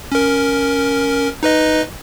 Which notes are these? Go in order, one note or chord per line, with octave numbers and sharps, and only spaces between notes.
C#4 A#4
D#4 B4 D#5